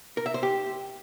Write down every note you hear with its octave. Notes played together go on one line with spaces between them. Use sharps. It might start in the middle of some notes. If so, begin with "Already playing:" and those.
A#4
E5
C5
G4